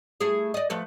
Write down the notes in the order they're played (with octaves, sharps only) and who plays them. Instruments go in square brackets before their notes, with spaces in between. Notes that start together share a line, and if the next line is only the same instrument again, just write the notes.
[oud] A3 E4 G#4
D5 D#5
F3 A3 B4